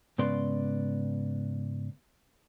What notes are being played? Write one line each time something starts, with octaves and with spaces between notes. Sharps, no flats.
G#2 C#3 B3 B4 D5 C6